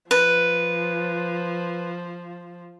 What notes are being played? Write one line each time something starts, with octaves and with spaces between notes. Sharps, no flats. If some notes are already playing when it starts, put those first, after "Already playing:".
F3 B4